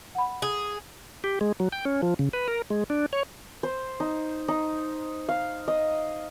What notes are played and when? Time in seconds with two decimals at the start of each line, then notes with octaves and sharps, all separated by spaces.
0.15 F#5 B5
0.42 G#4
1.24 G4
1.41 G#3
1.60 F#3
1.72 G5
1.85 C#4
2.02 F3
2.19 C#3
2.33 B4
2.48 A#4
2.70 G#3
2.90 D4
3.13 C#5
3.63 C5
4.00 D#4
4.48 D#4
5.29 F5
5.68 D#5